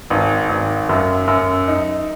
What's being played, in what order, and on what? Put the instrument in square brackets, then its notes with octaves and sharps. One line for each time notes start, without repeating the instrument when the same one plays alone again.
[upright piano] G#1
G#1
F#2
F#2
D#4